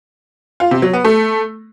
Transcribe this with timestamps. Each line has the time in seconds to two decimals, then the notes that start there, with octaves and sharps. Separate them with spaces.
0.60 F4
0.71 C3
0.82 F#3
0.93 B3
1.04 A3